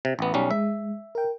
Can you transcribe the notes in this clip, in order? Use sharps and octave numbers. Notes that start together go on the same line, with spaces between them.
C3
A1 B3
B1 G3 C#4
G#3 E5
A#4 G5